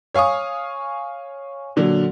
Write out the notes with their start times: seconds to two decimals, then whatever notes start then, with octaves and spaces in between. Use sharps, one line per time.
0.14 C#5 F5 G#5 C#6 D#6
1.76 A#2 D3 F#3